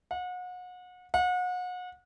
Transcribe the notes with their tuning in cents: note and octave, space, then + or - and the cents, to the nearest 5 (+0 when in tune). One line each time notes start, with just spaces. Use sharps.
F#5 -35
F#5 -35